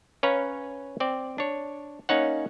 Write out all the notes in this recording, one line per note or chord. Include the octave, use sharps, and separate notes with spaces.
C#4 B4 C#5 F5 A#5
C4 D5
D4 C#5
A#3 C#4 D#4 C#5 F#5